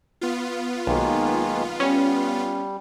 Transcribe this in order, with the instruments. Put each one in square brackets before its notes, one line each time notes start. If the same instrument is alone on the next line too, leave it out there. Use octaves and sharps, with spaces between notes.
[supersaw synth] B3 F4
[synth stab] B1 [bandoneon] D#3 G#3 A#3
[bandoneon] G3 [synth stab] C#4